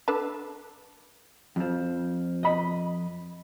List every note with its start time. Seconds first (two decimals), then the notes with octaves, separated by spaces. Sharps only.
0.08 D4 A4 B4
1.56 F2 F3
2.43 D#5 B5